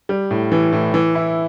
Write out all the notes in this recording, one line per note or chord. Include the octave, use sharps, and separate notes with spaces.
G3
A2
E3
A2
E3
E4